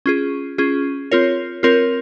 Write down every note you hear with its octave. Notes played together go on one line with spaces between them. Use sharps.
C#4 F4 G#4
C#4 F4 G#4
C4 F4 A#4 C#5
C4 F4 A#4 C#5